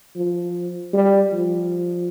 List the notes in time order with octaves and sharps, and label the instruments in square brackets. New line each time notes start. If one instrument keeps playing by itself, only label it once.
[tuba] F3
G3
F3